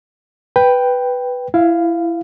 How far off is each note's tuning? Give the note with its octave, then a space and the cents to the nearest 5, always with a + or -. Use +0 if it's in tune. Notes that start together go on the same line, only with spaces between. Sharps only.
B4 +0 G5 +0
E4 +20 F5 +0